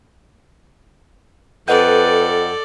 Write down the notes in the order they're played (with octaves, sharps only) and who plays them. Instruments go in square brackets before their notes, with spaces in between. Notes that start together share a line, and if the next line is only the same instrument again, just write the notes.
[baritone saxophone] F2 [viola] A4 D5 [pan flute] B4 [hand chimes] D#5 F#5 G6